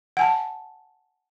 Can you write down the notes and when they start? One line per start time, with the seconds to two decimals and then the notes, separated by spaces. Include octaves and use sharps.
0.17 F#5 G#5 A5